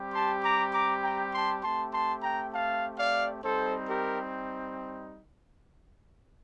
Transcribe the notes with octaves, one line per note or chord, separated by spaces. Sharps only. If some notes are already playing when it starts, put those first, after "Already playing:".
Already playing: G3 C4 G4
A5 C6
A#5 D6
A#5 D6
G5 A#5
A5 C6
A3 C4 G4 A5 C6
A5 C6
G5 A#5
F5 A5
D5 F5
G3 C4 D#4 A4 C5
G4 A#4